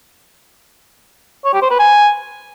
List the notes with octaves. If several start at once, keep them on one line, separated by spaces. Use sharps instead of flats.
C#5
G4
C5
B4
G#5